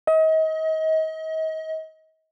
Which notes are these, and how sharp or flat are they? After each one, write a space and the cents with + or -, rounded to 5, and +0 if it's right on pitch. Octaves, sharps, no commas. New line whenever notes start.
D#5 +35